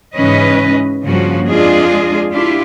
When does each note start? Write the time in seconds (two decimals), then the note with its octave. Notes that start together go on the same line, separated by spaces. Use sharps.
0.14 G#2 C#3 E3 C#4 B4 D#5
1.04 G2 C#3 F3 A#3 C#4 F#4
1.47 F2 G#3 D4 F4 G#4 D#5
2.30 D4 E4 F4 G4